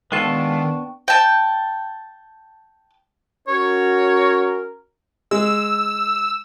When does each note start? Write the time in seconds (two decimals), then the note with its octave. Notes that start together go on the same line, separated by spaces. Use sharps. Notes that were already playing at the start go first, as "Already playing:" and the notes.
0.12 D#3 G#3 B3 D4 F4 A4 G5 C#6
1.08 G5 A5
3.48 C#4 F#4 A#4 C#5
5.31 G#3 E6